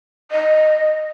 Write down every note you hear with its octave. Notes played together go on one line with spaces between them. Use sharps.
D#5